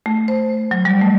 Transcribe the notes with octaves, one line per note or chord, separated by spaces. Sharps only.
A3
C5
F#3
G3
A3